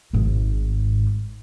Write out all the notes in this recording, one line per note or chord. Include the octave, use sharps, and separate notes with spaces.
G#1 G#2